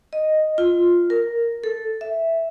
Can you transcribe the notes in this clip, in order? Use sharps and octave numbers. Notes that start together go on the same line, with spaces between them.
D#5
F4
A#4
A4
E5